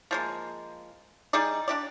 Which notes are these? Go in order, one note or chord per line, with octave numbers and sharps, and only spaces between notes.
F3 G#3 A#3
G3 D#4 G#4 D5
D4 G4 D5